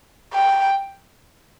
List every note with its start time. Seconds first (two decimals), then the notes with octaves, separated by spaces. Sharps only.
0.34 G5